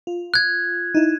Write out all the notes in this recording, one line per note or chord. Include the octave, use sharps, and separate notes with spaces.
F4
F#6 G#6
D#4 E4